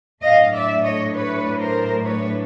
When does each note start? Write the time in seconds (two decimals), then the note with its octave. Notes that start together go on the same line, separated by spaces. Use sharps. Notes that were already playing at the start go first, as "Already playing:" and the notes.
0.22 A2 F#3 A3 D4 D#5 F5
0.53 D5 E5
0.83 C#5 D#5
1.13 B4 C#5
1.58 A#4 C5
2.04 B4 C#5